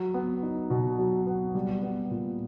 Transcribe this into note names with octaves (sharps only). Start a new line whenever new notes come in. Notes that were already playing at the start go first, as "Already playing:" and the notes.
Already playing: F#3
B3
D#4
B2
F#3
B3
G3
B3
A#2